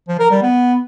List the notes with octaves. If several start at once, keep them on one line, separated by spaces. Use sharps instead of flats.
F3
A#4
G3
B3